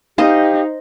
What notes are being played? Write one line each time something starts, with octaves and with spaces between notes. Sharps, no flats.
D#4 G4 C5 D#5 F5